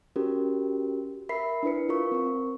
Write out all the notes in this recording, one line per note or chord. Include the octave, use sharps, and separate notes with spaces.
C#4 F#4 G4 A#4
A#4 E5 B5 B6 C7
D4 E4 B4 C#7
F4 A#4 C#6
C4 A#4 C#6